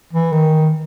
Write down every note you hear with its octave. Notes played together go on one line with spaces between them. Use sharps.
E3
D#3